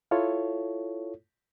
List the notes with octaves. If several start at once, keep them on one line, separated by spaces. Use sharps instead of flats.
E4 F4 A4 C#5